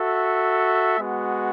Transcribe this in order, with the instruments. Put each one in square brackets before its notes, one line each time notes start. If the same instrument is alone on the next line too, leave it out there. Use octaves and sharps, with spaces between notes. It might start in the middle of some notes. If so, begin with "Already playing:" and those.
Already playing: [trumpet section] F#4 A4 E5
G#3 B3 F#4